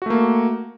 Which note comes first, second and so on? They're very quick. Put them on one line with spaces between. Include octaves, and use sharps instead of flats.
F#4 A3 A#3